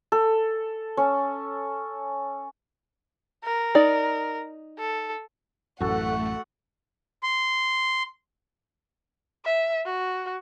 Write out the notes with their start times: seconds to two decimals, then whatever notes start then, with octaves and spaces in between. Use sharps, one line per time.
0.12 A4
0.97 C#4
3.44 A#4
3.75 D#4 D5
4.79 A4
5.80 A1 F#2 A3 F#4 A4 F#5
7.23 C6
9.45 E5
9.86 F#4